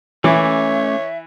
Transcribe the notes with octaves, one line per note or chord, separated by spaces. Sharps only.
E3 A3 C#4 C#5 E5 D6